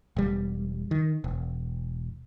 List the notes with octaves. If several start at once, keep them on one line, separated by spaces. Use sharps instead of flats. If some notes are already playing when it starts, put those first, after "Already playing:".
E1 G3
D#3
E1